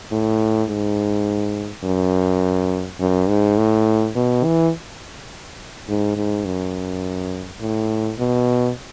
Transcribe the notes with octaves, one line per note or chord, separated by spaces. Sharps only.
A2
G#2
F#2
F#2
G#2
A2
B2
E3
G#2
G#2
F#2
A2
B2